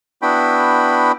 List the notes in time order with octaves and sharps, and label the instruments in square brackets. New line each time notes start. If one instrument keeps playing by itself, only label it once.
[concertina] B3 D4 E4 F#4 G5 B5